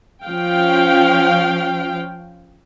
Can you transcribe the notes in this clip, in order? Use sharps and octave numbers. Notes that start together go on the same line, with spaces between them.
F3 C#4 F5 G5